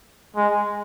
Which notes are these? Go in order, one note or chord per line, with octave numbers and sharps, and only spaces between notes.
G#3